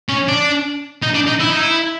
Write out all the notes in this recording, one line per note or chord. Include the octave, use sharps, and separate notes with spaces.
C#4
D4
D#4
D4
D#4
E4
D#4
E4